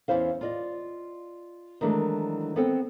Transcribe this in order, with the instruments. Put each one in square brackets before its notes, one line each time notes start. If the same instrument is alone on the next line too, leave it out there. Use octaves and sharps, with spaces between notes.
[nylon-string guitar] E2 D#3 C#4 E4 C5 F5
F4 D5 D#5
D#3 E3 F#3 G#3 A3 D4
B3 C4 A4 C5 G5